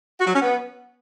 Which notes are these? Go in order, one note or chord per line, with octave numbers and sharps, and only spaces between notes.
F#4
F#3
C#4
B3